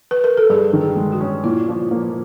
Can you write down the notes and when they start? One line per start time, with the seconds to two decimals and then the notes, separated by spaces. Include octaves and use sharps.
0.11 B4
0.24 A#4
0.37 A4
0.50 G2 G#4
0.73 D#3
0.81 G#4
0.97 G#3
1.12 F#4
1.21 C#4
1.44 A#2 E4
1.68 F3
1.91 A#3